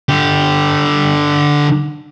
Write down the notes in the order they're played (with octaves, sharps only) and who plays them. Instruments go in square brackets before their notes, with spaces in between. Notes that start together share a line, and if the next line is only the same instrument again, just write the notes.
[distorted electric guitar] D3 G4